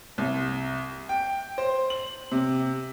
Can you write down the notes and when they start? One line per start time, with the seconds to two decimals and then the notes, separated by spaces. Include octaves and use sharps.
0.18 C2
1.09 G5
1.58 C5
1.90 F#7
2.32 C3